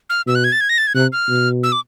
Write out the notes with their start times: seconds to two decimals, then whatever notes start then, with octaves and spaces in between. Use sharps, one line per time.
0.10 F6
0.27 B2 E6
0.35 F#6
0.44 G#6
0.52 A6
0.61 G#6
0.69 A#6
0.78 A6
0.87 G#6
0.95 C3 F#6
1.13 F6
1.29 B2
1.63 E6
1.72 D6